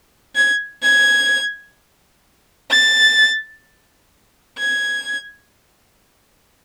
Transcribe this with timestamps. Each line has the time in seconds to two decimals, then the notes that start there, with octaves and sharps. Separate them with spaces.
0.36 G#6
0.83 G#6
2.71 A6
4.59 G#6